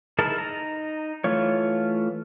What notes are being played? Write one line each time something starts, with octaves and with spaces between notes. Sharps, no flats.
D#4 E4 G#4 A#4 A5
D#4 A#5
E3 A3 F4 C#5